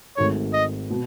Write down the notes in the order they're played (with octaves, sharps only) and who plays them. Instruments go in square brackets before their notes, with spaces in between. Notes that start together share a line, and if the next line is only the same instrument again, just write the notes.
[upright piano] G#1 G#2 D#3 A3 [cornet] C#5
[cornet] D#5
[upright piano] B2